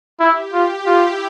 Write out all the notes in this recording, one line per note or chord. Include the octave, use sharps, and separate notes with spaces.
E4 G4
F4
E4 F4